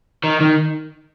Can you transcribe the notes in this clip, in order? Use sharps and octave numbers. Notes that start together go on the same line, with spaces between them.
D#3
D#3